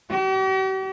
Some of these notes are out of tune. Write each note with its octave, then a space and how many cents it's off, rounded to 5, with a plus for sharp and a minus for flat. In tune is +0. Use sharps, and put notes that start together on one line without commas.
G4 -45